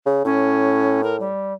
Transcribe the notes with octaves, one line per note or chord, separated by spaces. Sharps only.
C#3
A2 C#4
A#4
G3